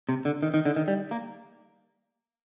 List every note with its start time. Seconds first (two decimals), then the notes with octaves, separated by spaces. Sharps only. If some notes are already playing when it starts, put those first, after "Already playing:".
0.09 C3
0.25 D3
0.43 D#3
0.54 D#3
0.65 D3
0.76 D#3
0.88 G3
1.11 A#3